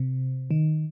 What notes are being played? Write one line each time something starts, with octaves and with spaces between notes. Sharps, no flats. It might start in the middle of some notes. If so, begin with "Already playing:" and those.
Already playing: C3
D#3